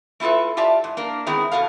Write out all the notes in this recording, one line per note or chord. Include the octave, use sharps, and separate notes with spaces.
A3 E4 F4 A4 B4
F4 G4 D5 E5 A5
G#2
A#3 D4 A#4
D#3 G#3 B3 C4 E4
B2 F#4 A4 F5